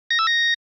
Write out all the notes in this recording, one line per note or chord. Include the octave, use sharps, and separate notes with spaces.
A#6
E6
A#6